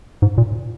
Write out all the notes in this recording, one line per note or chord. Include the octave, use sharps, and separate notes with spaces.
G#2
A#2